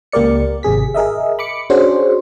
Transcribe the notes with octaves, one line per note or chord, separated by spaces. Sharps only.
C#2 A#3 G4 A#4 D5 C#7
G#1 C3 G#4 B6
G#4 A#4 D#5 E5
B5 D6 C#7
C#4 D4 F#4 G#4 C5